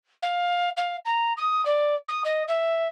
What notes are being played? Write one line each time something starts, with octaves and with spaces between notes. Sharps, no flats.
F5
F5
A#5
D#6
D5
D#6
D#5
E5